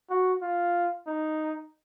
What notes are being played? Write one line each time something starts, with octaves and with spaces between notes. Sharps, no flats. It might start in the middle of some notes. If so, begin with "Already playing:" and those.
F#4
F4
D#4